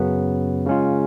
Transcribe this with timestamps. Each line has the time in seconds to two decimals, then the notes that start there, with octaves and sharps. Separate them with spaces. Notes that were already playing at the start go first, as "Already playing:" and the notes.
Already playing: F#2 C#3 F#3 B3
0.66 C#3 G#3 C#4 F4